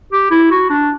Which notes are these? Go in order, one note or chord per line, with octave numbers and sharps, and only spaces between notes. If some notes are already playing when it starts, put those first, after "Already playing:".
G4
E4
F#4
D4